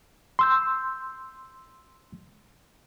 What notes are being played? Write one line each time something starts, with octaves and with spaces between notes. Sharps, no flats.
C6 E6 G6